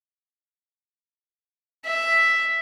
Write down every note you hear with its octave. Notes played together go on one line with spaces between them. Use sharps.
E5